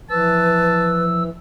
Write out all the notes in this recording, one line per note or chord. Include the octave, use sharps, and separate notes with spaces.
E3 F3 B4 A5 E6